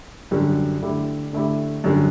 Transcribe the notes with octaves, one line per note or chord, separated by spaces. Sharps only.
F#2 D3 G3
D3 A3 E4 G4
D3 A3 E4 G4
F#2 D3 G3